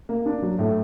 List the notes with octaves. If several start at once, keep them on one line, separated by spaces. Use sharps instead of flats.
A#3
D4
F#3
A2